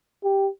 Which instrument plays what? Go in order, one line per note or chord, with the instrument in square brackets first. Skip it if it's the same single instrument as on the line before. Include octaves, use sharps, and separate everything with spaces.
[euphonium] G4